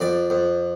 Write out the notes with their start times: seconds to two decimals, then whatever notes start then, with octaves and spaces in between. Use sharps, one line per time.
0.01 F2 D5
0.30 F2